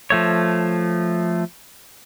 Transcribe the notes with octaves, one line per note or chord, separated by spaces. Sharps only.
F3 A3 C#5